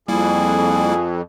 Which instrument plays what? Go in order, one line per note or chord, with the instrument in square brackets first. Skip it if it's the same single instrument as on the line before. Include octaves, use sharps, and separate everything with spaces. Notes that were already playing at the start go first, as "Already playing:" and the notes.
[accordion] F2 [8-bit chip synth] G3 A#3 E4 [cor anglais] G#4